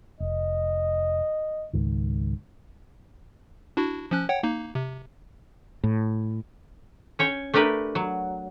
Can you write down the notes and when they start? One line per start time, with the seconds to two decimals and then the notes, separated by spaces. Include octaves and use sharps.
0.20 F1 D#5
1.73 C#2 G#2 D#3
3.77 D4 E4 F#4
4.11 F3 C#4 F#6
4.29 C#5 F#5 G5
4.43 A#3 D#4
4.75 C3
5.84 A2
7.19 C#4 C#5 G5
7.54 A3 D4 G4 A#4 B4
7.95 F#3